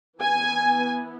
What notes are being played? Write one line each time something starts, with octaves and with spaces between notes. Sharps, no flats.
E3 B3 G#5